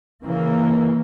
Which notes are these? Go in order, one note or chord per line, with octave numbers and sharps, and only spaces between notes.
C#3 E3 A#3